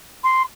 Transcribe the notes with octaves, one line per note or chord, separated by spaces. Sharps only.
C6